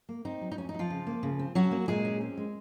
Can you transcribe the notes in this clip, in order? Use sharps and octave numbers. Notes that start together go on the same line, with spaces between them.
A#3
C4 D#4
F#3
D#4
F2 C#4
D#4
F#3
F3 F4
C#3
A#3
C#3
C4
F#3 C#4 F#4
A#3
A#2 G#3 G#4
C#4
C4
G#3